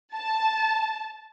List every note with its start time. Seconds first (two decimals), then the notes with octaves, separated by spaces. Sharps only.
0.13 A5